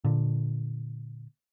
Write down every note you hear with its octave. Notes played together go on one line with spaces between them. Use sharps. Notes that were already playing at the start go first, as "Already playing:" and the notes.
A#2 D3